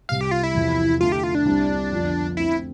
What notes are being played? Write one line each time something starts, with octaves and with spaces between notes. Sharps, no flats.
C2 C3 G3 F5
G4
F4
E4
E2 C3 F3 B3
D3 A3 E4 F4
G4
F4
D4
C2 C3 G3 C4 E4
F2 D3 F3 B3 F4
D3 A3 C4 E4